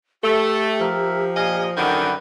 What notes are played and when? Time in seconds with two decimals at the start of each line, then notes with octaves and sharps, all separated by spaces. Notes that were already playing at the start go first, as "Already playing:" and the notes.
0.24 A3 G4 A4
0.80 F3 A#4 E5
1.36 A#2 D#5 F5 G#5
1.77 F#2 D3 D#3 B4 F#5 G5